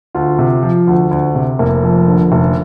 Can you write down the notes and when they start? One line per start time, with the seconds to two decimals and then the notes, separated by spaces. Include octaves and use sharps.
0.15 D2 F4
0.39 C3
0.63 F3
0.87 D2
1.11 D2
1.35 C3
1.59 F1 A#3
1.83 F2
2.08 D3
2.32 F1